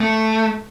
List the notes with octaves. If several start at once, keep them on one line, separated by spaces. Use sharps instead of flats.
A3